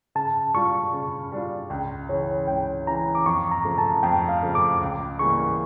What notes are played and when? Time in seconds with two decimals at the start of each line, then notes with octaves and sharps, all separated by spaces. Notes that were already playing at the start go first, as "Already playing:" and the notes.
0.15 C#3 A5
0.54 G3 D4 F4 C#6
0.93 C#3
1.32 G3 D4 F4
1.70 C#2 G5
2.09 C#3 E3 C#5
2.48 C#2 G5
2.87 C#3 E3 A#5
3.15 D6
3.26 F2 C#6
3.51 A#5
3.65 C#3 F3 A3
3.78 A5
4.03 F2 G5
4.29 F5
4.42 C#3 F3 A3
4.55 D6
4.81 C#2
5.19 C#3 E3 G3 A#3 C#6